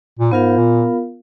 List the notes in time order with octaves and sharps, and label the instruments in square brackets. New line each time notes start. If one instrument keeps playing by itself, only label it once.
[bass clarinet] A#2
[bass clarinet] G#2 [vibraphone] B3 F4 A#4 F5
[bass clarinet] A#2